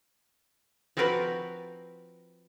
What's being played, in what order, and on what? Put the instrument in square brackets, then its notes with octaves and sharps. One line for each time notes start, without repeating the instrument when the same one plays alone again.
[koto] F3 C4 F#4 A#4 B4